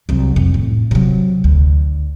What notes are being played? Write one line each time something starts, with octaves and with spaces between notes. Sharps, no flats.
C2 F#3
F2
A2
C3 F#3
D2